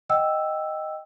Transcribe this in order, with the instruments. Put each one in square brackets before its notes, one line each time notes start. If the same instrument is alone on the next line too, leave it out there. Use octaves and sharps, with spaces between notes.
[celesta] D#5 F#5 G5 E6